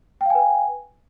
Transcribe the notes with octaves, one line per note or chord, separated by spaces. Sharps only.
B4 F5 G5 G#5